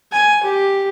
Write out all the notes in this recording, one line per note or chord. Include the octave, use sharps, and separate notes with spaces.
G#5
G4